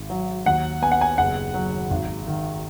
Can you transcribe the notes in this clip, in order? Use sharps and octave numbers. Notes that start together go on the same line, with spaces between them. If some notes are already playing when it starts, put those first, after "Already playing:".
Already playing: G#1
F#3
D#2 F#5
B3 G#5
F#5
G#5
F#1 F#5
F#3
G#1
D#3